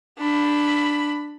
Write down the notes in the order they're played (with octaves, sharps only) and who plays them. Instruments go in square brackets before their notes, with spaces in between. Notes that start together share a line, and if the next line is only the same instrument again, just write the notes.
[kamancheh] D4 B5